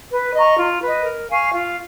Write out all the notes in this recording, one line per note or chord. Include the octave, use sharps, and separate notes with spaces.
B4
D#5 A#5 C#6
F4
B4
D#5
A#4
F5 G#5 C#6
F4